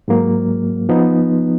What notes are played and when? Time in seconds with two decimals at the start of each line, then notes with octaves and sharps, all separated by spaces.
0.08 G#2 F#3 A#3
0.89 F3 B3 D#4